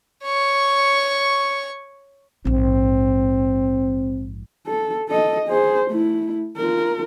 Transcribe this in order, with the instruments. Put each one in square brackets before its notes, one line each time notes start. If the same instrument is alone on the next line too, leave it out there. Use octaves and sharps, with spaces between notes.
[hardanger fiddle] C#5 C#6
[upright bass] A#1 G#2 [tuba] C4
[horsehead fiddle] A4
A4 D#5
G#4 C5
A3 E4
F4 A#4